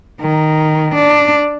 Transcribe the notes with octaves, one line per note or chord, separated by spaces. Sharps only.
D#3
D4